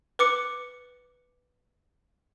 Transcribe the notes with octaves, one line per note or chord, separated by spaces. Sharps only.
B4 D6 C#7